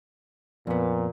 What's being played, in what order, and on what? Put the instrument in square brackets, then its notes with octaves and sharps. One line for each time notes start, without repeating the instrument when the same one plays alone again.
[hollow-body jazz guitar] F2 B3 [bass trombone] A#2